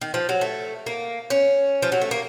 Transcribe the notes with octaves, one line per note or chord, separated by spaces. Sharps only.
D#3
F3
F#3
A3
A#3
C#4
F3
F#3
A3
A#3